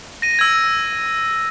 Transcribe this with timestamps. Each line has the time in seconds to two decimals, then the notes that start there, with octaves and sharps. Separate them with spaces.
0.22 A#6 D#7
0.39 E6 G#6